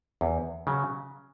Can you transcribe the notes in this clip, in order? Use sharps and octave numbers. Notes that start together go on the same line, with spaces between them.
E2
C#3 F#3